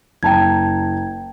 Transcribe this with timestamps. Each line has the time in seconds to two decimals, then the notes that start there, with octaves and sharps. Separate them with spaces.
0.23 F#1 G5 A5 A#5 G#6